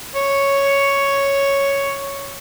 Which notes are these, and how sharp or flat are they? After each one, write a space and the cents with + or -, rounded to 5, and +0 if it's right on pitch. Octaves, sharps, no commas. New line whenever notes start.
C#5 +0